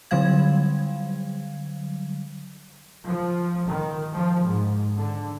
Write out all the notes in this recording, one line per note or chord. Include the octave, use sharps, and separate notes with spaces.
D3 F#3 G3 F5 G#6
F3
D#3
F3
G#2
D3